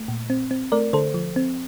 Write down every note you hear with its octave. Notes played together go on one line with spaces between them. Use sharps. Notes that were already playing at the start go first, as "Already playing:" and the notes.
Already playing: A3
A#2
C4
C4
A3 A#4 D5
D3 A4 C5
F3
C4